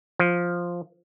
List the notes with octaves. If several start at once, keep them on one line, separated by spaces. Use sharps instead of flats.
F3